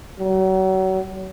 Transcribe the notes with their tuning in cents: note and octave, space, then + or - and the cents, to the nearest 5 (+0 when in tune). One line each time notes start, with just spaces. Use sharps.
F#3 +35